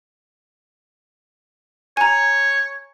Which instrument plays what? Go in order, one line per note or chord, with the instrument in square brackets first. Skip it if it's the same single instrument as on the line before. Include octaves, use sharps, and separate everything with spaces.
[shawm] C#5 [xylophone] G#5 A#5